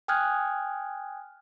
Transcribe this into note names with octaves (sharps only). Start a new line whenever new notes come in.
G5 G#5 D#6 F6 F#6 G#6